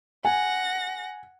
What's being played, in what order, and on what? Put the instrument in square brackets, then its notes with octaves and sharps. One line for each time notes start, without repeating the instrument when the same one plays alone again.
[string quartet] F#5 A#6 [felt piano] G#5